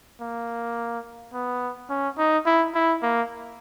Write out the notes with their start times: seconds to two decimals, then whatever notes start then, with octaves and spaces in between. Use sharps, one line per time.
0.21 A#3
1.33 B3
1.90 C#4
2.18 D#4
2.46 E4
2.75 E4
3.03 A#3